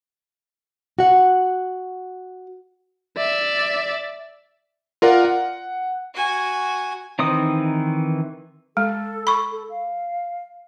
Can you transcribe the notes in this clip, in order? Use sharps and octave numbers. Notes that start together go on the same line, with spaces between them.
F#4 F#5
D5 E5
F4 A#4 D5 F#5
F#5
F#4 G#5
D#3 E3 C4 D#4 D#6
G#3 A4
B5 C#6
A4
F5